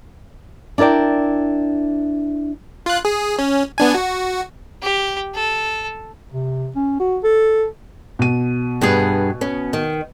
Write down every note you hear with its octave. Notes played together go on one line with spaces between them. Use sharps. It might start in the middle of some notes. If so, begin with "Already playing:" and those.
D4 E4 A#4 D5 G5
F4 F#6
G#4
C#4
B3 D4 G#5
F#4
G4
A4
C3
C#4
F#4
A4
B2 D#7
G2 B3 G#4
B3 C#4
D#3